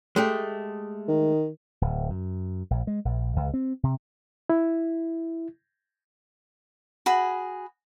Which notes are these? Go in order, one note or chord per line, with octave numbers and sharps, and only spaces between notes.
G#3 A3 G4
D#3
D1
F#2
A#1
G#3
A#1
C#2
C4
C3
E4
F#4 G#4 B5